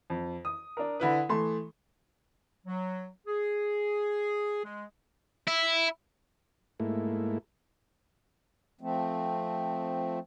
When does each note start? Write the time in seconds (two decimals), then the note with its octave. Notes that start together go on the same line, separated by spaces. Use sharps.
0.10 F2
0.45 D#6
0.77 D4 A#4
1.00 D3 E4 B4
1.29 E3 A3 C6
2.65 F#3
3.27 G#4
4.64 G#3
5.48 E4
6.80 G#2 A3 A#3 E4
8.81 F3 A3 C4